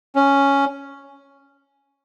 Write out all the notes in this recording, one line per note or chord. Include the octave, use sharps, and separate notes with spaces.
C#4